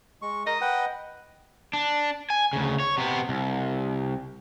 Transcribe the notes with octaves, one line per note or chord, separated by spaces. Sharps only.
G#3 C#6
A#4 D#5
B4 F#5 G5
D4
G#5
D2 C#3
C#5
C3 B3
C2